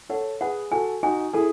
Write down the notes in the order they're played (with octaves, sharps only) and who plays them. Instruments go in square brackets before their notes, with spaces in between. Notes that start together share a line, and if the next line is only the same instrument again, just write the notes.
[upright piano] A4 C#5 [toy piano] F#5
[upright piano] G#4 B4 [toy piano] F#5
[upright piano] F#4 A4 [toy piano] G#5
[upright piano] D#4 F#4 [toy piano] G#5
[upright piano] E4 G#4 [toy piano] A4